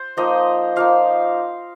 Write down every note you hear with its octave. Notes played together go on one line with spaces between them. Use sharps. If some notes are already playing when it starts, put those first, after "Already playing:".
Already playing: C5
F3 A#3 D#4 D#5
F3 A#3 D#4 F5